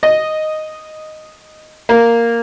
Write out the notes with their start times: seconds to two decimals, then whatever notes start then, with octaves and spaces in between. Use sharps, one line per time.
0.03 D#5
1.89 A#3